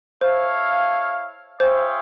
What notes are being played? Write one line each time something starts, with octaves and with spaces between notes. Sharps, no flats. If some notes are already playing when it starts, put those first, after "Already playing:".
E4 A4 C5 C#5 F5
F4 G#4 C5 C#5 E5 G5